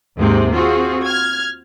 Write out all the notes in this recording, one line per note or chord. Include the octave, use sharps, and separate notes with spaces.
D#2 G#2 C3 G#3 C4
C4 F4 F#4 G#4
F6 G#6